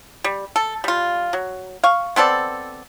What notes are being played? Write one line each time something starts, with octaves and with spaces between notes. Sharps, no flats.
G3
A4
G3 F4
F#3
F5 C#6
B3 C4 A4 D5